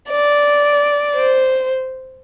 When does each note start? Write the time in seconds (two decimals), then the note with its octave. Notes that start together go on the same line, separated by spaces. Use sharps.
0.10 D5
1.15 C5